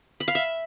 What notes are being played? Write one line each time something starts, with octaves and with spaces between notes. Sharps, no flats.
B5
F5
E5